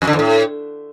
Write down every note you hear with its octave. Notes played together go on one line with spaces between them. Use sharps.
F2
D3
E2
A2